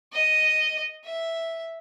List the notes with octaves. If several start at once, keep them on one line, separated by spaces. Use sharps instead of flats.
D#5
E5